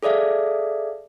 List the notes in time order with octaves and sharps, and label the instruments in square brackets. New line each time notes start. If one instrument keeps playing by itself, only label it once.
[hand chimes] G#4 A4 D5 E5 F5